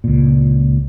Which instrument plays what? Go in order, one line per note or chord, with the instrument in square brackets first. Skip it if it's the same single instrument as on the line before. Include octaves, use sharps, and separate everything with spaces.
[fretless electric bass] C#2 A#2